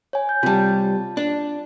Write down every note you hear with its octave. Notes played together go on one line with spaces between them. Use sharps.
C#5 G#5
G6
C3 G3 F4 A5
D4